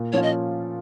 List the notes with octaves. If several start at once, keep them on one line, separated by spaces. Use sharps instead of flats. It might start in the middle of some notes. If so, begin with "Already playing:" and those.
Already playing: A#2
F3 C#4 F4 C#5
D#5